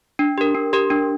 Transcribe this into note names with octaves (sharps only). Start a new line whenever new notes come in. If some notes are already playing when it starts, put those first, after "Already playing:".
D4
G4 A#4
D4
G4 A#4
D4